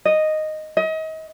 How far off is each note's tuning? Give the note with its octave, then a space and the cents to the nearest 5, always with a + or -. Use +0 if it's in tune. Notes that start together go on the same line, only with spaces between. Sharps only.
D#5 -5
D#5 +35